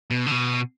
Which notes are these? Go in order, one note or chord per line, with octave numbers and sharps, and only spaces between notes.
B2
D3
B2